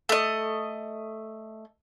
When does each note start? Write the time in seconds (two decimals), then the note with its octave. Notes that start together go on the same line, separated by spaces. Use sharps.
0.09 A3 D#5